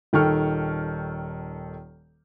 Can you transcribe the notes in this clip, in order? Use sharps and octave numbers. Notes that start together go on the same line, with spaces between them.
D#1 D#3 A4 G5 C#6 F6